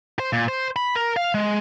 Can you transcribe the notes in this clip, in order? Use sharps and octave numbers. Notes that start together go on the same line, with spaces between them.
C5
A#2
C5
B5
A#4
F5
G#3